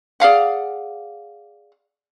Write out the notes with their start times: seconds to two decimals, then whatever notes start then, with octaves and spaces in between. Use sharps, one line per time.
0.20 G#4 D5 F5 F#5